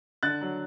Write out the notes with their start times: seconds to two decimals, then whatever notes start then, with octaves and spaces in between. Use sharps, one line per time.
0.23 D3 F#6 A6
0.41 F#3